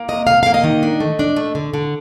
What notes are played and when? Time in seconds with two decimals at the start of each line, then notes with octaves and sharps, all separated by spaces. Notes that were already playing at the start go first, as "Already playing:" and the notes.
Already playing: A#3
0.09 C3 D#5
0.27 C3 F5
0.43 A#3 F5
0.54 D#5
0.64 D#3
0.83 D4
1.00 A3
1.19 D4
1.36 A3
1.55 D3
1.74 D3